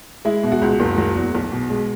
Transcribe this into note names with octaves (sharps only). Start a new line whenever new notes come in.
G#3 E4
B2
F#4
C#2
F#1
F#3
E2
B1
B2
G#3